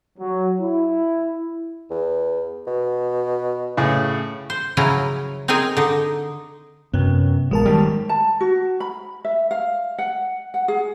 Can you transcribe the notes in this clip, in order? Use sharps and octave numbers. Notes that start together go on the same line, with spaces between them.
F#3
E4
E2
B2
A2 C#3
C5
C#3 F3 F#3 C#4 E4 A#5
C4 D#4 G#4 A#4 G#5
D3 D#4
F#2 C3 B3
A1 G#3 A#4 A5
D#3 G3
A5
F#4
B5
E5
F5
F#5
F#5
G#4